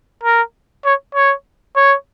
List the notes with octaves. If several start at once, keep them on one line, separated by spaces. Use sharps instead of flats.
A#4
C#5
C#5
C#5